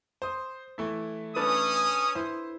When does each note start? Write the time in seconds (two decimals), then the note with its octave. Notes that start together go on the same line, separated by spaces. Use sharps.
0.22 C5 D#6
0.78 E3 A3 E4
1.36 C#4 D4 A4 B4 D#6
2.15 E4 C5